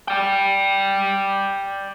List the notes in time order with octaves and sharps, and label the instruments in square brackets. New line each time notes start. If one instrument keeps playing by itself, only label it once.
[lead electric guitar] D5 G5